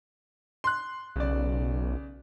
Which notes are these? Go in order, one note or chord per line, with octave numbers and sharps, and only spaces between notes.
C6 F#6
B1 C#3 D5